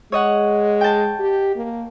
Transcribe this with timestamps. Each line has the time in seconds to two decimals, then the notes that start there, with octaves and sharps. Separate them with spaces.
0.12 G#3 C#5 D#5 F#5
0.81 G5 A5
1.20 G4
1.56 A#3